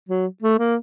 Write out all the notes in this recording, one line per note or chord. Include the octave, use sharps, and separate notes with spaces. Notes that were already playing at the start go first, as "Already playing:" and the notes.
F#3
A3
A#3